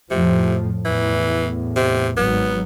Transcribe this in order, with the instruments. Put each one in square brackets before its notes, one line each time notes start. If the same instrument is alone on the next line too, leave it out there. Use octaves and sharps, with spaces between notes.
[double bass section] F2 A2 F3 [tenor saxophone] C3
[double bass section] E2 A2 [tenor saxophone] E3
[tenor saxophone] C3
[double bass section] G#1 F#3 [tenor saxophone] B3